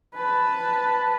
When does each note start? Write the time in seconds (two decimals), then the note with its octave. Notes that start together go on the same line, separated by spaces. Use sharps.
0.15 B4 A5